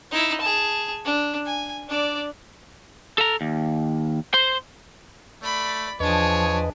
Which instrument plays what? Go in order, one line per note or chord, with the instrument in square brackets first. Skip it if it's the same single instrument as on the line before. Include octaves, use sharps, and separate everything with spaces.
[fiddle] D#4 E4
G#4 A5
D4
G#5
D4 D5
[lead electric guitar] A4 A#5
D#2
C5 C6
[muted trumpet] A3 [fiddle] D5 B5
[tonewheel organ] E2 B4 D#5 [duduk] F3 [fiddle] D4 G#4 [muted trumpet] C#5